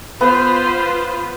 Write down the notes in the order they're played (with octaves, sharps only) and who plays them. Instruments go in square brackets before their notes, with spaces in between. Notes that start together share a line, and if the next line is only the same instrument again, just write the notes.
[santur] B3 [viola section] F4 B4 C5